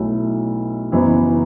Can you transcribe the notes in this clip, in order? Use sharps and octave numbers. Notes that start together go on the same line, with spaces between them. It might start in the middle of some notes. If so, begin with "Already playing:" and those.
Already playing: B1 B2 F#3 A3 E4
F#1 F#2 E3 B3